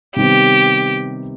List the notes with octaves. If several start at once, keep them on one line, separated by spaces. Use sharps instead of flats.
C3 D#3 G3 B3 G4